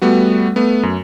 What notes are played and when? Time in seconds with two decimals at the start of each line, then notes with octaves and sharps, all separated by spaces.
0.02 G3 A3 B3 F#4
0.56 A3 B3
0.83 F#2